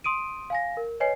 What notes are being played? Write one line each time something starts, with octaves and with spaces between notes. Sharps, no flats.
C6 D#6 D7 D#7
F5 G#5 A#6
A#4
B4 C#5 D#5 G#5 C7